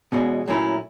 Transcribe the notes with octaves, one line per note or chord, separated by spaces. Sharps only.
E2 B2 G#3 C#4 F#4
A#2 F#3 A3 C#4 E4